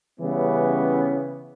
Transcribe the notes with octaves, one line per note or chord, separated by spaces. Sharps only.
C#3 E3 G3 B3 C#4